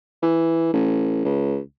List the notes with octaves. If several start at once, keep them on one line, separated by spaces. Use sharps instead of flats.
E3
A1
C#2